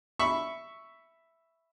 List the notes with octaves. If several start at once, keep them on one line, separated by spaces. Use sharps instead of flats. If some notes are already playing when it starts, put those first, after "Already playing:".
E5 B5 C#6